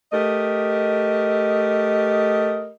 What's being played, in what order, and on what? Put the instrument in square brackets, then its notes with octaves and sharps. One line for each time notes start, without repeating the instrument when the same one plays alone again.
[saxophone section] A3 G4 A#4 D#5